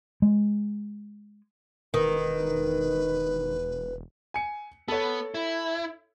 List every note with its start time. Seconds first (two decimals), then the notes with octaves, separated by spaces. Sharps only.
0.22 G#3
1.94 E1 D#3 B4
4.34 G#5 C#7
4.88 B3 A4 C#5
5.34 E4